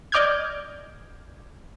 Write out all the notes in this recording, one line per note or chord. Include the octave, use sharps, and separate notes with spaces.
D5 D#5 D6 F6 G6 G#6